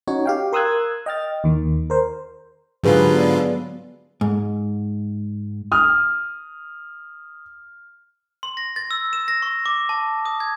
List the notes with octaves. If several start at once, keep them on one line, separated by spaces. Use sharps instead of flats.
C#4 D#4 F#4 C#5
G4 F5 G5
A#4 C6 D#6 E6 F#6 G#6
D#5 G5 F6 A6
D#2 D#3
A#4 C5
G#2 D3 F#3 F4 G4 G#4 B4 C#6
B3 D5
G#2
D#6 F6
C6
A#6
A6
E6
E7
A#6
C#6
D6
A5
D#6
G#6